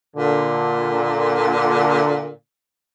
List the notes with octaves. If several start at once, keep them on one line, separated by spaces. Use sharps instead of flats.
A#2 D3